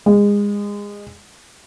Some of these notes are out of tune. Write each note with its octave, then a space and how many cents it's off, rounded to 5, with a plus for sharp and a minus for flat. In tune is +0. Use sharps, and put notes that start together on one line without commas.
G#3 -25